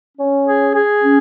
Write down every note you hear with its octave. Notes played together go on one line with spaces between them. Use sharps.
C#4
G#4
G#4
C#4